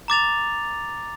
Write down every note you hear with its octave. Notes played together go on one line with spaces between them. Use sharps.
A#5 D6 A6 F7